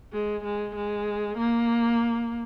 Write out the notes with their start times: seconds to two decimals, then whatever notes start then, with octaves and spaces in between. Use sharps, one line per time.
0.13 G#3
0.44 G#3
0.75 G#3
1.37 A#3